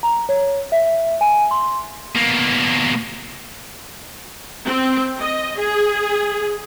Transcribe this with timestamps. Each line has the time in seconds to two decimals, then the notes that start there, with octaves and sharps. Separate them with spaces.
0.03 A#5
0.29 C#5
0.72 E5
1.21 G#5
1.51 C6
2.15 B2 A#3
4.65 C4
5.20 D#5
5.58 G#4